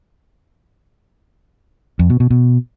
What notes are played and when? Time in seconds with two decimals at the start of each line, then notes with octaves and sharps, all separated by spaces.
1.99 F2
2.10 B2
2.20 B2
2.30 B2